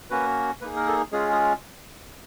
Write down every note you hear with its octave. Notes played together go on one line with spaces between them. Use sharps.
A#3 C#4 F#4 B4
A#3 D#4 G#4 B4
A#4
A4
G#3 C#4 F4 G#4
G#4